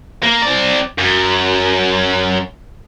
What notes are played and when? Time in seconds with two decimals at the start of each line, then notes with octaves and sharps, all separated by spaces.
0.24 A#3
0.43 C4 D5
0.98 F#2